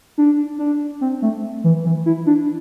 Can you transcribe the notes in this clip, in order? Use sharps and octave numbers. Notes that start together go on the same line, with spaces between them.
D4
D4
C4
A3
E3
E3
E4
D4